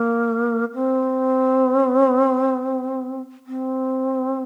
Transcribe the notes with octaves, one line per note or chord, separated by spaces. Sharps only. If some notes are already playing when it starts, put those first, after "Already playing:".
Already playing: A#3
C4
C4